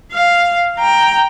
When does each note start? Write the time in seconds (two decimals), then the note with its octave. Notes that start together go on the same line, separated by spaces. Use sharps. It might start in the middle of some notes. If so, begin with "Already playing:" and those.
0.12 F5
0.78 G5 A#5